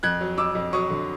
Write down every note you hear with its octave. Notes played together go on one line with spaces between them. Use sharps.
F2 F#6 G#6
F#3
F2 D6 E6
F2
F#3 C#6 D#6
D3